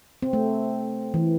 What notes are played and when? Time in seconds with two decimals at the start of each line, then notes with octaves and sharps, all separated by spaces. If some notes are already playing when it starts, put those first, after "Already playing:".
0.22 C4
0.33 A3
1.14 E3